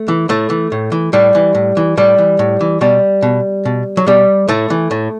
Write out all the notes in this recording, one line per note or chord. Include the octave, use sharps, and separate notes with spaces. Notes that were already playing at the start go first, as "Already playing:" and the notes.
Already playing: A3
E3
A2 A3
E3
A2
E3
A2 G3
E3
A2
E3
A2 G3
E3
A2
E3
B2 G3
B2
B2
F#3
B2 G3
A2 A3
E3
A2